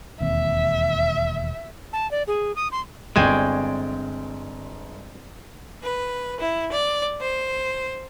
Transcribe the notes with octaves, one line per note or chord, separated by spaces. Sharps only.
E1 D#2 C4 E5
A5
D5
G#4
D#6
C6
G1 G#3 C4 D5 G5 G#5 C#6 E7
B4
E4
D5
C5